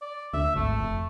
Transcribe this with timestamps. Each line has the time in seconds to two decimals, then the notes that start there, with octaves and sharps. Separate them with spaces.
0.01 D5
0.33 D2 E5
0.56 G#1 A3
0.80 F1